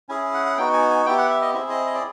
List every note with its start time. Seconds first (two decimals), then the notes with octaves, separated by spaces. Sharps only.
0.09 C#4 E4 G#4 G#5
0.34 F#5
0.46 F#5
0.57 B3 D#4 F#4 G5
0.73 G#5
0.90 G#5
1.06 B3 E4 G4 G5
1.18 F#5
1.30 E5
1.42 D#5
1.54 C4 E4 G#4 E5
1.70 D#5
1.87 D#5
1.94 D5